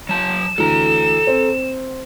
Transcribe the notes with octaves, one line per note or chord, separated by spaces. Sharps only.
F#3 A5 E7
D2 E3 A4 A#5
C4